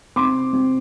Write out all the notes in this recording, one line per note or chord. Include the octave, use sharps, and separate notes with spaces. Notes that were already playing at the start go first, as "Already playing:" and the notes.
C3 C6 D6
C3